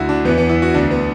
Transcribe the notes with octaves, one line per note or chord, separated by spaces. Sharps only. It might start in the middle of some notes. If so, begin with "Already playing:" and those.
Already playing: D2 D3 E4 F#4
D4
E2 E3 B3
B3
E4
F#4
D2 D3 D4
B3